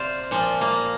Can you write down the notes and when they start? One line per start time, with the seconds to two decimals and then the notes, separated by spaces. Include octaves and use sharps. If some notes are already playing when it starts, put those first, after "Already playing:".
Already playing: C3 C5 D5 F5
0.31 A#2 F3
0.61 A#3